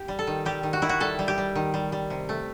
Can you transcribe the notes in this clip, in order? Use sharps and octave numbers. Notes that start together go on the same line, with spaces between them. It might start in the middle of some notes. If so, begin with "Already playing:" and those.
Already playing: G4
G3
A4
D#3
G3 G4
D#3
F#4
D#3 E4
F#4
G3 A4
G3
G4
G3
D#3
G3
G3
C3
A3